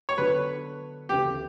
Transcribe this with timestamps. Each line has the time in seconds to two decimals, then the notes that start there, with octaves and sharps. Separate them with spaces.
0.09 C#5
0.17 D3 F#3 B3 D4 B4
1.09 D2 C#3 E3 B3 G4